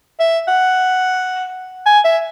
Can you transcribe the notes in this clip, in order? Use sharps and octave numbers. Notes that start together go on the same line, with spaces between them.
E5
F#5
G#5
E5